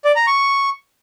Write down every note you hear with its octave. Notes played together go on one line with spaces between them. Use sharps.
D5
A#5
C#6